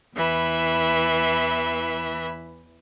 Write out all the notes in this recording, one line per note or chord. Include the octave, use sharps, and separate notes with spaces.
E2 E3 E5 B5